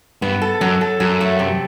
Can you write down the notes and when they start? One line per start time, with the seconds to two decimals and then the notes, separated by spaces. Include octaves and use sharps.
0.22 G2 B3
0.42 A4
0.61 F#2 F#3
0.81 A4
1.00 F#2 F#3
1.21 A3
1.39 C3